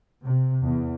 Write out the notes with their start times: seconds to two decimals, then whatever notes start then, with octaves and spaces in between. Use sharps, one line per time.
0.21 C3
0.64 E2